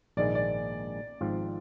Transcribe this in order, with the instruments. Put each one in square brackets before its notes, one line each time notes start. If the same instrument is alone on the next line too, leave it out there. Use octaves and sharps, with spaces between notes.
[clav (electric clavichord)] A#1 G#2 D#3 G#3 [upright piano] D5
[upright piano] D5
[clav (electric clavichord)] G#1 G#2 F3 C4 F4